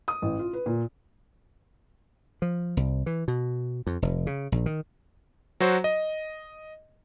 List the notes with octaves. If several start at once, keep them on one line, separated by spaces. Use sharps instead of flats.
D#6
A1
F4
B4
A#2
F3
C2
E3
B2
F2
F1
C#3
A#1
D#3
F#3 F#4 C5
D#5